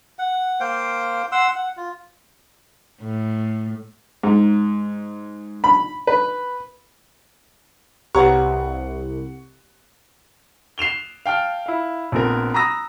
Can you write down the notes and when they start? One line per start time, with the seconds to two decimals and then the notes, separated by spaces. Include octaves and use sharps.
0.19 F#5
0.60 A#3 C5 F5 G5
1.32 F#5 C6 E6
1.56 F#5
1.77 F4
3.01 A2
4.23 G#2
5.64 B5
6.07 B4
8.15 C2 G4 B4 C#5 F#5 A#5 C#6
10.78 C7 E7 F7 G7
11.26 F5 G5 A5 F6
11.66 E4 F5
12.12 A#1 B3 C4 A#4
12.54 A#5 B5 D#6 E6 A#6